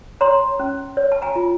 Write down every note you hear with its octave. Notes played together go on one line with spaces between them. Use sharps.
C#5 A#5 C6
C#4
C#5
A5
G#5 A#5
F4